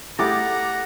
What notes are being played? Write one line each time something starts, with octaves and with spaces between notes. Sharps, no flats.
A3 E4 G4 G#4 F#5 A#5 D6 A6